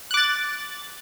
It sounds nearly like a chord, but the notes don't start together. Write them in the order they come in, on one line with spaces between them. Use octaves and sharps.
F#6 D6 A6